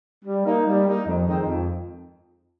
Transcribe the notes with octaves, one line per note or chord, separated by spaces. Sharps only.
G3
A#3 D#4
G3
A#3 D#4
F2
D#3 G#3 C4 D#4
F2